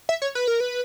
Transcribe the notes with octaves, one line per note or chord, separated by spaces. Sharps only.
E5
C#5
B4
A#4
B4